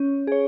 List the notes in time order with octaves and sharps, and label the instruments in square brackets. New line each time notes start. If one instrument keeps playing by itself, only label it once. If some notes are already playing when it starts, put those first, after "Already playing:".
Already playing: [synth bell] C#4 C#5
G#4 C#5